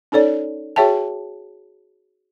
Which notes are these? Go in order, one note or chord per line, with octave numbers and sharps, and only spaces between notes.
C#4 D#4 A4 C#5 D5
F#4 G#4 C#5 E5 G5 A5